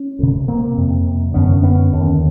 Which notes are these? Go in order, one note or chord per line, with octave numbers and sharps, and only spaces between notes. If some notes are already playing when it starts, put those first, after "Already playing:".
Already playing: C#4
D2 C3
A#3 C4
F2 C3
F#2 D3 B3 C#4
B3 C#4
D#2 D3